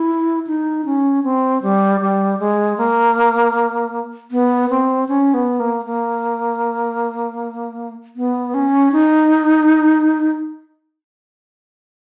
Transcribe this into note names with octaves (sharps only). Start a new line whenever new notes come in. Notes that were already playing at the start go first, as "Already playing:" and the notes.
Already playing: E4
D#4
C#4
C4
G3
G3
G#3
A#3
B3
C4
C#4
B3
A#3
A#3
B3
C#4
D#4